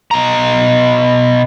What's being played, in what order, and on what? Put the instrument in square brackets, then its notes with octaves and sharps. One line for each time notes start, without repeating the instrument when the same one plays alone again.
[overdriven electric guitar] B2 A#5